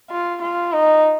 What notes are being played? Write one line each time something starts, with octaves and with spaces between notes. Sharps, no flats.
F4
F4
D#4